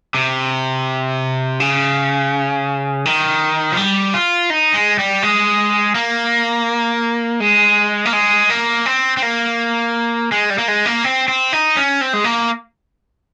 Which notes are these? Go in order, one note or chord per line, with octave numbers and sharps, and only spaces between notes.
C3
C#3
D#3
F3
G3
F4
D#4
G#3
G3
G#3
A#3
G#3
A#3
G#3
A#3
C4
C4
A#3
G#3
G3
A#3
G#3
A#3
C4
C4
D#4
C#4
C4
G#3
A#3